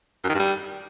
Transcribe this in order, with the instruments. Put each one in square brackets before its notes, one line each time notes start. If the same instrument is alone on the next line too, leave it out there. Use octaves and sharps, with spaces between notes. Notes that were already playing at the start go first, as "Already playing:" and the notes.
[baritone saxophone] F#2
D#3
G2
G3